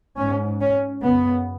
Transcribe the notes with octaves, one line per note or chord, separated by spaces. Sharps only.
G#2 C#4
C#4
F#2 C#3 B3